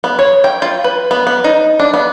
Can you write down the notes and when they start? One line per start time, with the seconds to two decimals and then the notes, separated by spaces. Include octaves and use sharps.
0.04 B3
0.19 C#5
0.44 G5
0.62 F4
0.84 B4
1.11 B3
1.27 B3
1.44 D#4
1.79 D4
1.94 B3